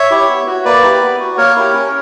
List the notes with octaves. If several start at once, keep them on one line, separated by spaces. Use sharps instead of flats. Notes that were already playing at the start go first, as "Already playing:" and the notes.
Already playing: C#5 E5
E4 G4
B3
F#4
A#3 B4 D5
E4 G4
B3
F#4
A#3 A#4 C#5
E4 G4
C#4